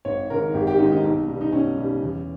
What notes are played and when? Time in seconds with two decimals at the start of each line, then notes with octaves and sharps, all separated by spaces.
0.05 G#1 C#5
0.30 G#2 D#3 A#4
0.54 G#1 G4
0.67 G4
0.78 G#2 D#3 D#4
0.92 D#4
1.03 B1
1.28 B2 G3
1.41 D#4
1.52 B1 C#4
1.77 B2 G3
2.01 E2